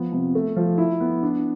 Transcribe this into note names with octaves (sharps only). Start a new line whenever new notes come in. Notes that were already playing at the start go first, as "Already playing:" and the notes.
Already playing: F3 B3
C3
A3
F3
E4
B3
D4